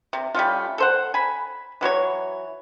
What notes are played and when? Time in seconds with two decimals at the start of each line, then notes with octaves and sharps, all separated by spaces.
0.13 C3
0.35 G3 A3 C#4 F4
0.78 A4 C5 F#5
1.14 G#5 B5
1.81 E3 F#3 C5 C#5